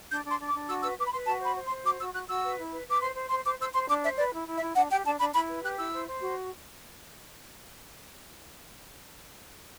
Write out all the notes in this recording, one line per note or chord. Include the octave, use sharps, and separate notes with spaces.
D4 G6
D4 C6
D4
D6
D4
F#4 E6
B4 E6
B4 D6
B5
B4 C6
F#4 A5
C5 B5
C5
C6
C5
F#4 D6
F#4 E6
F#4 F#6
F#4 E6
B4
E4
B4
B4 D6
C5 C6
C5
C5 C6
C5 D6
C5 E6
C5 C6
D4 D6
C5 E5
B4 D5
E4
E4
E5
E4
D4 F#5
G4 G5
D4 A5
D4 B5
E4 B5
B4
G4 F#6
E4 E6
C5
C5
F#4